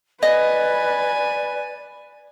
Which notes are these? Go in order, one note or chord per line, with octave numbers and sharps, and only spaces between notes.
B4 D5 D#5 G#5